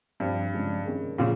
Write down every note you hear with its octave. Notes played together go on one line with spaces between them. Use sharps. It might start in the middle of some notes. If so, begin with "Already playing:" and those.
G2 F3 C4 G4
C#3 F3 G#3
C3 D#3 A#3 C#4 G#4
A#2 C#3 F3 A#3 F4